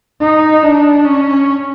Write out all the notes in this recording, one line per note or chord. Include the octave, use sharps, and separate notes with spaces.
D#4
D4
C#4